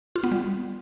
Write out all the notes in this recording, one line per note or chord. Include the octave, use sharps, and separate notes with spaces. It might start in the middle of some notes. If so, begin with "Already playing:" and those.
F4
B3
G3